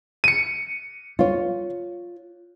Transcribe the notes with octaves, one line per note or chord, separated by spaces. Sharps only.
C#7 D#7
F4 C#5